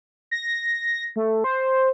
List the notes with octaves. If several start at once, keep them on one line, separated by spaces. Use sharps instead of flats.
A#6
A3
C5